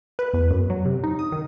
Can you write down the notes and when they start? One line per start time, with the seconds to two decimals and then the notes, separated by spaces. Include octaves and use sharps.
0.19 B4
0.33 E2
0.51 F#2
0.70 F#3
0.85 C3
1.04 D#4
1.19 D#6
1.32 D#3